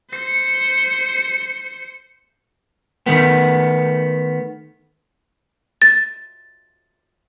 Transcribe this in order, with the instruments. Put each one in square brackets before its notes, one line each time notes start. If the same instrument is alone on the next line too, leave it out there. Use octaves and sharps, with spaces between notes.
[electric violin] C5 C#7
[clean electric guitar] D#3 A3 B3
[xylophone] A6